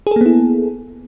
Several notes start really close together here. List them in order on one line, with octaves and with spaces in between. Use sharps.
G#4 A4 A#3 B3 E4